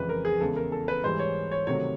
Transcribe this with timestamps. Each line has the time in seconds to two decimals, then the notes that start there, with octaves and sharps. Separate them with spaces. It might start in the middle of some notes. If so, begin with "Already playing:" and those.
Already playing: F2 C#3 E3 G#3 B4
0.09 A#4
0.25 G#4
0.41 E2 C#3 E3 G#3 A4
0.56 A#4
0.72 A4
0.88 B4
1.03 G#2 E3 G3 C5
1.19 C#5
1.51 C#5
1.67 C3 D#3 F#3 A3 C#5